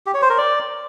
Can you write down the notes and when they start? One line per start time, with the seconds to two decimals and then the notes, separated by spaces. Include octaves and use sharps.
0.06 G4
0.14 C#5
0.22 C5
0.30 A#4
0.38 D5